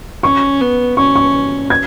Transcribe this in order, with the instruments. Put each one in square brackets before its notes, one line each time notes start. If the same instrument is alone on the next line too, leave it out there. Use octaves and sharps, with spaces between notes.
[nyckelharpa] C#4 [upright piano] C#6
[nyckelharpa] B3
[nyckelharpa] C#4 [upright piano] C#6
[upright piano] C#6
G#6